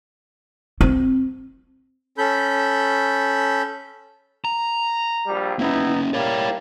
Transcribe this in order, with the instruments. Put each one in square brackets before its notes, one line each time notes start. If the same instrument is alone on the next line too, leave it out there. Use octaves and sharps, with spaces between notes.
[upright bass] C4
[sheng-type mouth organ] C#4 A4 B5 G6
[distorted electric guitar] A#5
[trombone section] A#1 G3
[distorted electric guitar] A#3 C#4 [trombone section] B3 D#4 E4
[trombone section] G3 A#3 [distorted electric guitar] E4 C#5